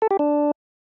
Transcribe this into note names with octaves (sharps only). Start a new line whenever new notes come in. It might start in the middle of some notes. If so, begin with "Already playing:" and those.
A4
G4
D4